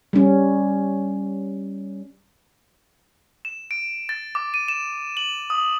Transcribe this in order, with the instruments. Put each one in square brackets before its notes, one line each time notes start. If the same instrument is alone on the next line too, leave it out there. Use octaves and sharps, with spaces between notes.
[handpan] G3 C#4
[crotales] E7
D7
A6
D6
D#7
E7
F#7
D#6